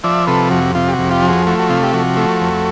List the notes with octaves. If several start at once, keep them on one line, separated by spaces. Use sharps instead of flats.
F3 D5 E5
C3 A4 B4
F2 F#4
C3 F4
G4
F#4
F2
F4 G4
F3
F#4 G#4
A3 F#4
F#4
C3 F4
G4
F3 F#4
A3
F2